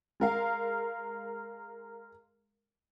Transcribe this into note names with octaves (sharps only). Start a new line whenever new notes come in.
G#3 A#4 F5